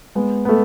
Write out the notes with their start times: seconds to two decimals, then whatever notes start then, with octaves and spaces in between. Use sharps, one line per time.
0.15 G#3 B3
0.45 B3
0.49 A3